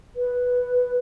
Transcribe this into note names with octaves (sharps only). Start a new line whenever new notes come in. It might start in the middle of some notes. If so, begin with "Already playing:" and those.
B4